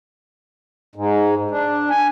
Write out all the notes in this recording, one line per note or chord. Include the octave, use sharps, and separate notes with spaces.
G#2
D4
G#5